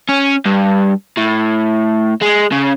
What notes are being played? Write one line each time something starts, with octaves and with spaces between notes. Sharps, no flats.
C#4
G2
A2
G#3
C#3